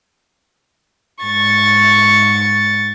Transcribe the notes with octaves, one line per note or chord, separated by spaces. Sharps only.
G#2 C#6 A6